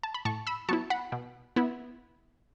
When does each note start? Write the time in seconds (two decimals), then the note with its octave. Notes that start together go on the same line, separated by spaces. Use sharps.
0.03 A5
0.14 B5
0.25 A2 A5 C#6
0.47 B5 E6
0.69 F#3 B3 E4 A5 C#6
0.90 F#5 B5
1.12 B2
1.56 B3 E4